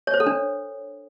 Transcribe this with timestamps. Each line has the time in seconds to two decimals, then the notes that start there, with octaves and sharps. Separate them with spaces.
0.07 C#5
0.14 C5
0.20 A4
0.26 D4